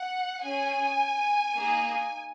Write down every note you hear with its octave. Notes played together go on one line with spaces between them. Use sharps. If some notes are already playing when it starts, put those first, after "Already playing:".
Already playing: F#5
C#4 G#4 G#5
A#3 D#4 G#4